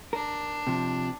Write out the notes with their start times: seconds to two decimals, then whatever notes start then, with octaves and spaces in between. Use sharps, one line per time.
0.13 D4 A#4
0.67 C3 F3